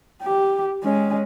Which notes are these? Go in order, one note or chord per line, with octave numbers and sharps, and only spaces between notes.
G4
G#3 C#4